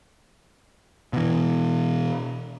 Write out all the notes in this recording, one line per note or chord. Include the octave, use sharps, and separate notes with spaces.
B2 E3